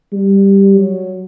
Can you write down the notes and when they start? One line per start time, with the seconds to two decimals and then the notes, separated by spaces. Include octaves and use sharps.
0.13 G3
0.77 F#3